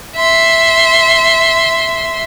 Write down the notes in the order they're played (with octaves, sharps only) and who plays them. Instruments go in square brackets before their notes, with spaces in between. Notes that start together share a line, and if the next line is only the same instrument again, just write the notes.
[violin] E5 C6